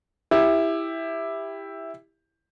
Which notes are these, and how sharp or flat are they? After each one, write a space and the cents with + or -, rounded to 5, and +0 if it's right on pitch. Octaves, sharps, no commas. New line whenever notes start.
E4 +0 G4 +15